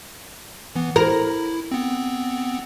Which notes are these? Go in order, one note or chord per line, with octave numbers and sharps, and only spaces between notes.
E3 B3
E4 A#4
B3 C4